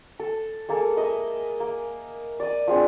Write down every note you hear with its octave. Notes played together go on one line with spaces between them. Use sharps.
A4
G#3 A#3 A4
D#5 E5 A#5
A#3
D5 D#6
F3 G#3 C4 D4